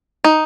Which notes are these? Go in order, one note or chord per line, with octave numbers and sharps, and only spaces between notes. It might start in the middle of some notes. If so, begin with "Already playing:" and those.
D#4